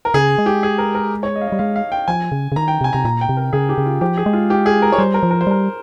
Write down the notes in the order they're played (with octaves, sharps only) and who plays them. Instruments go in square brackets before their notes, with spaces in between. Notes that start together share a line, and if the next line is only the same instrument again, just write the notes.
[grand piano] A#4
[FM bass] C#3 [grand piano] G#4
[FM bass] G#3
[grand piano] G4
G#4
A#4
A#4
C#5
D#5
F5
D#5
[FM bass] G3
[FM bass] G#3 [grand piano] F5
[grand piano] F5
G5
[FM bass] F3 [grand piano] G#5
[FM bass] C#3
C#3
[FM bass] D#3 [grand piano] A#5
[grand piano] G5
[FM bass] C3 [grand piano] G#5
[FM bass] C3 [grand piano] A#5
[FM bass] A#2 [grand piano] A#5
[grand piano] G5
[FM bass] C3
[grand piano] A#4
[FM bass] C#3 [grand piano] G#4
[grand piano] G4
[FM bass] C#3
[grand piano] F4
[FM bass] F3 [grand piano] G4
[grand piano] G#4
[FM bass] G#3
[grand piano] F4
G4
G#4
A#4
C#5
[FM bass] G3 [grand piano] C5
[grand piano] A#4
[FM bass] F3
[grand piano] A#4
C5
[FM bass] G3 [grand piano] A#4